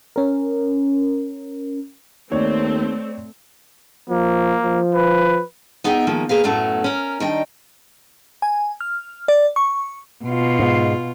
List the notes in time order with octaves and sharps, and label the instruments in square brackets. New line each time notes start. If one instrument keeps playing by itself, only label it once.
[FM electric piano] C#4 A#4
[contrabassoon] D#2 [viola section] A3 C4 [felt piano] C#5 D5
[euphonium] F3 [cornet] A#3
[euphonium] F3
[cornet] B4
[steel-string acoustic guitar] B3 D#4 G#4 E5 F#5 G5
D#3 F3 G#3 A#3
A#3 G#4 B4 F5
F#2 A2 F#3 A3 B3 C#4
C#4 A#4
D#3 G3 D4 D#4 D#5 G5
[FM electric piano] G#5
F6
D5
C#6
[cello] B2 F4
[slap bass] G#2